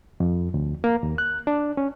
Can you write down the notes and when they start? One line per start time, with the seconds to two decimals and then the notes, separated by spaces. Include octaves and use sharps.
0.20 F2
0.54 D2
0.84 A#3
1.03 D#2
1.18 F#6
1.47 D4
1.77 C#4